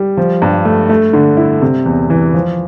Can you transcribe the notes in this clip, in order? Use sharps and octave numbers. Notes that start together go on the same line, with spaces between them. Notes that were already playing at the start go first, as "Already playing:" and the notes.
Already playing: G3
F3
G2
A3
A3
D3
E4
C3
E2
E3
F3